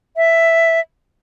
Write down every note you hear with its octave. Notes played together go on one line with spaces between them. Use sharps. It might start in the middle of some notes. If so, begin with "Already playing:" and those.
E5